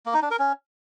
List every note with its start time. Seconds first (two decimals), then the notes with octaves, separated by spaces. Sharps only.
0.06 A#3
0.14 D#4
0.22 D4
0.31 A#4
0.39 C#4